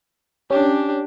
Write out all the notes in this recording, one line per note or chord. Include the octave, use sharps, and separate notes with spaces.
C#4 D4 G4